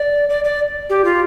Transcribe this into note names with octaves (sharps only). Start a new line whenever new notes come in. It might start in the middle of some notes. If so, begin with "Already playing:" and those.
Already playing: D5
D5
D5
G4
F4